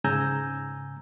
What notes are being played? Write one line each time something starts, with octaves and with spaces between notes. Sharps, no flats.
G#2 C#3 G#5 A#5 E6 G6